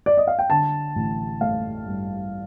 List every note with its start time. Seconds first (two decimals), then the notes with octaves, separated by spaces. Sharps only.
0.06 D5
0.17 D#5
0.27 F5
0.39 G5
0.50 D3 A5
0.95 A1
1.41 A3 F5
1.87 G2